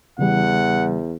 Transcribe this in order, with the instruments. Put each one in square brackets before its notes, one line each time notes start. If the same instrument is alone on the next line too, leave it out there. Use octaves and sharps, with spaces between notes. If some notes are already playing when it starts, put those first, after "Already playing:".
[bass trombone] E2 [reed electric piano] C#3 E3 G3 [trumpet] F#5